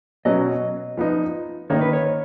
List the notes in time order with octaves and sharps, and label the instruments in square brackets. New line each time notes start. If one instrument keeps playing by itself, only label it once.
[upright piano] B2 F#3 C#4 [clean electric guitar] D#5
[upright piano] F3 B3 D#4
[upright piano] D#3 A#3 D#4 [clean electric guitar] C#5
[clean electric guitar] B4
C#5